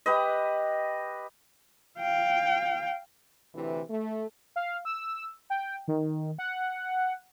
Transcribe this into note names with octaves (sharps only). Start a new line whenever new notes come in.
G4 B4 D#5
F5 G5
D2 C3 E3
A3
F5
E6
G5
D#3
F#5